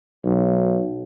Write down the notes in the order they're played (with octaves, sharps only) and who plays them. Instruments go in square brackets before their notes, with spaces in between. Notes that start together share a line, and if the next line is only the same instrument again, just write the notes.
[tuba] B1